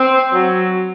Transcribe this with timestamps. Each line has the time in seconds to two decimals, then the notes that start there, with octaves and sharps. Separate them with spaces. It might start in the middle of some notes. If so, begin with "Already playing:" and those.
Already playing: C4
0.33 F#3